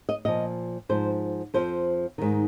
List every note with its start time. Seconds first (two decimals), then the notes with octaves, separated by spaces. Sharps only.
0.09 D#5
0.25 A#2 F3 D#5
0.89 G#2 F3 C5
1.54 F2 F3 C5
2.18 G#2 D#3